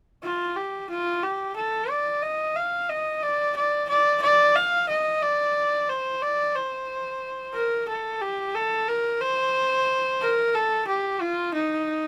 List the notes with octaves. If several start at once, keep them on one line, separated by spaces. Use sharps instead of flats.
F4
G4
F4
G4
A4
D5
D#5
F5
D#5
D5
D5
D5
D5
F5
D#5
D5
C5
D5
C5
A#4
A4
G4
A4
A#4
C5
A#4
A4
G4
F4
D#4